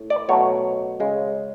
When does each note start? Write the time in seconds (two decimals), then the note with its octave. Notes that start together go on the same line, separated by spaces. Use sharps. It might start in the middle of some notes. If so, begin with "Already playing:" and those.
Already playing: A2
0.10 D5
0.29 B2 F#3 A3 C#5
1.00 C#3 G#3